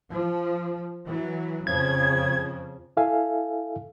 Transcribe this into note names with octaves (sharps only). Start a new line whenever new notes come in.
F3
E3 F#3
F2 C#3 F3 G#6
E4 A4 E5 F5 G#5